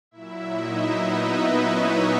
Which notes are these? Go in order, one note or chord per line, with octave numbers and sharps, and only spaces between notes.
A#2 F#3 E4 E5
D#4 D#5
B3 B4
C#4 C#5